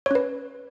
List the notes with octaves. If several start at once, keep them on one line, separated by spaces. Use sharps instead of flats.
C#4 B4 C#5